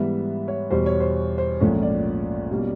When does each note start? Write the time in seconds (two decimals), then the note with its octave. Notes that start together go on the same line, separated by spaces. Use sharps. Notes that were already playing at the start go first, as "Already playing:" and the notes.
Already playing: G#2 E3 G3 B3 E5
0.48 C#5
0.70 E2 B2 G3 C5
0.86 C#5
1.00 C5
1.38 C5
1.60 A#1 G#2 F3 A3 C#4 C#5
1.82 D5
2.51 B2 G3 A#3 C#4